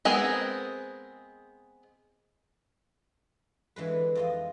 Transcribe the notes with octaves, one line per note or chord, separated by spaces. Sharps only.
G#3 B3 C4 G#4 A#4
D3 E3 G#3 B4
F2 F4 D#5